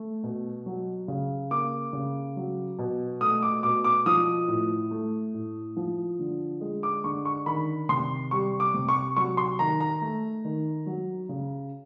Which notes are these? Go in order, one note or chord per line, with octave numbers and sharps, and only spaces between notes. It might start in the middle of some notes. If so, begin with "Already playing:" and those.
Already playing: A3
B2
F#3
C#3
A#3 D6
C#3
F#3
B2
A3 D#6
D6
B2 D6
D6
F3 D#6
A2
A3
A2
F3
D3
G#3
D6
D3 C#6
C#6
D#3 B5
C3 C6
G3 C#6
D6
C3
C#6
F#3 C#6
C6
D#3 A#5
A#5
A3
D#3
F#3
C#3